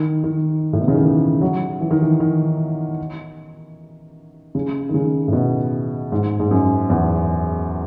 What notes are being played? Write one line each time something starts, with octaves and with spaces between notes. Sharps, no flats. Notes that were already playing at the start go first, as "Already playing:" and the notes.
Already playing: D#3
D#3
A2
B2
C#3
D#3
E3
F#3
E3
D#3
E3
D#3
C#3
D#3
C#3
A2
B2
G#2
G#2
F#2
E2